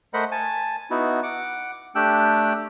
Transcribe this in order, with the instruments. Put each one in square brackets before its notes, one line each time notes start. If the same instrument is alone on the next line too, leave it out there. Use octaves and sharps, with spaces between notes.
[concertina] A3 A#4 C5 D#5 F#5 B5
G#5 A5
B3 D#4 E4 F#4
F#5 D6
A3 D4 G4 G5 E6 F#6